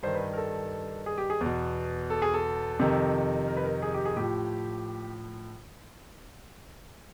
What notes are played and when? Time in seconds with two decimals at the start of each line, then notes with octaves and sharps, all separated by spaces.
0.03 G2 D#3 C5
0.15 B4
0.33 A#4
0.37 A4
1.06 G#4
1.18 G4
1.30 G#4
1.41 E2 B2
2.10 A4
2.22 G#4
2.34 A4
2.79 F2 C3 D#3
3.48 A#4
3.57 B4
3.65 A#4
3.82 G#4
3.94 G4
4.05 G#4
4.17 A2 F3 G4